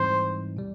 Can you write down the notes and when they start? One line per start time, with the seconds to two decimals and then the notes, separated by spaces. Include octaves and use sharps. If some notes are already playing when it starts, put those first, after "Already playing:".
Already playing: G#2 E3 G3 C4 D#4 C5
0.57 B2 G3